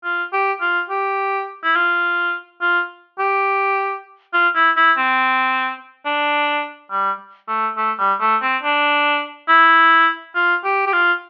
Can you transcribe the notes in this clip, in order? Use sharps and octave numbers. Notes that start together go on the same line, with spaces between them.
F4
G4
F4
G4
E4
F4
F4
G4
F4
E4
E4
C4
D4
G3
A3
A3
G3
A3
C4
D4
E4
F4
G4
G4
F4